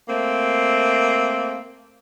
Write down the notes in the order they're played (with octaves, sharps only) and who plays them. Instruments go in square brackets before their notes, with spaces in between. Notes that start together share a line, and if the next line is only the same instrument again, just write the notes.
[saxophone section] A3 A#3 C4